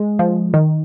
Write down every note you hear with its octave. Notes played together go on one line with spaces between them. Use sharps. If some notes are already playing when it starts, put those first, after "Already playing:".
Already playing: G#3
F3
D#3